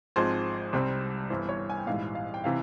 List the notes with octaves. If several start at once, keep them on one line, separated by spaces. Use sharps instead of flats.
G#1 G#2 F3 G#3 C4 C5
C2 C3 G3 C4
G1 G2 E3 C5
C#5
G#5
G5
A#1 G#2 E3 G3 F5
F5
G5
C3 E3 F5